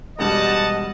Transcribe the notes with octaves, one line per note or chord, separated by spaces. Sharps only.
E1 G2 G3 G#3 F#4 D#5 F#5 A5